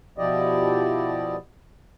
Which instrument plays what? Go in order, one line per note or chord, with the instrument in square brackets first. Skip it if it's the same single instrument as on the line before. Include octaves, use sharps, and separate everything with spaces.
[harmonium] B2 F3 E4 G4 D5 D#5